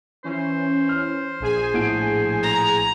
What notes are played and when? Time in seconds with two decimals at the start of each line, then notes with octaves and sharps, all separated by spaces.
0.24 E3 C#4 C5
0.89 F6
1.40 A#1 G#4 G#5
1.74 A2 F#5 D7
2.43 A#5